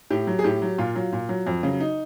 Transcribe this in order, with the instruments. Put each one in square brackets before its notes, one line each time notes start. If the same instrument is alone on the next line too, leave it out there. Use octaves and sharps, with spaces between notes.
[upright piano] A2 G4
F#3
G#4
A2 G4
F#3
A#2 F4
F#3
A#2
F#3
F2
C#3 F#3
D#4